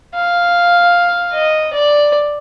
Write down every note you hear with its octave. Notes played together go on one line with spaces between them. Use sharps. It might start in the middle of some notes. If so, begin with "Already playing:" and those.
F5
D#5
D5